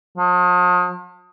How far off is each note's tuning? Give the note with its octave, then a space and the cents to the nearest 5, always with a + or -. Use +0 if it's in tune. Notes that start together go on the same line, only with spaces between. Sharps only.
F3 +45